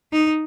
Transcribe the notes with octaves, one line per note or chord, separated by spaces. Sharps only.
D#4